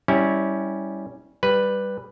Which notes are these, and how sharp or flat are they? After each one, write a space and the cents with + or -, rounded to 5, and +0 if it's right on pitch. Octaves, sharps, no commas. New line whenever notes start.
G3 +0 C#4 +0 E4 -20
G3 +0 B4 +0